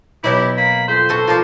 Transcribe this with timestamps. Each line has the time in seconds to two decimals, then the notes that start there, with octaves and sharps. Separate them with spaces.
0.24 B2 F#3 B3 E4 G4
0.57 A#3 B5
0.88 F2 C5
1.09 F#4 A4 B4
1.27 F3 A#4 D5